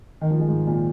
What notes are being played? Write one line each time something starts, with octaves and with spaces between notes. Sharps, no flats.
D#3
F3
G#3
G#2
A#2